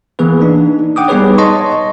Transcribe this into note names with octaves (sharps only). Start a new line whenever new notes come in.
E3 A#3 B3 G#4 B4
D4 D#4
F#5 G5 D6 D#6
G3 B3 D#4 G#4 B4 C#5
C#5 D#5 A5 C6 C#6